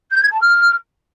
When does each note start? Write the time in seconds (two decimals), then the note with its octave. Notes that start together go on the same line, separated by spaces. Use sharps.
0.12 G6
0.22 G#6
0.31 A5
0.41 F6